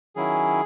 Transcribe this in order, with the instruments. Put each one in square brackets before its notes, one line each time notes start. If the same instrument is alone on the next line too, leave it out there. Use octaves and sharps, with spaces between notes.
[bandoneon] D#3 F#3 C#4 E4 G#4